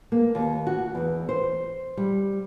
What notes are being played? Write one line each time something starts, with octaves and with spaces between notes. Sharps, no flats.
A#3
D#2
F#4
E2
C5
G3